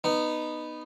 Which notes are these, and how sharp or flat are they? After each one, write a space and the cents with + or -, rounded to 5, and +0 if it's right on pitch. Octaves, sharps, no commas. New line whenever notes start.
B3 +0 D#4 -15